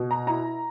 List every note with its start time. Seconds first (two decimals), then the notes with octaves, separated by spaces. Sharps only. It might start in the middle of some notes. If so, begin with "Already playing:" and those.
Already playing: B2
0.11 A#5
0.27 E4 A#5